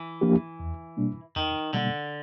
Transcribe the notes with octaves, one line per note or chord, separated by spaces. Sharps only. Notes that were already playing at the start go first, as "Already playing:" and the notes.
Already playing: E3
F3 A#3 D4 G4
E2
B2 G3 A#3 D4
E2 D#3
B2 D3 G3 A#3 D4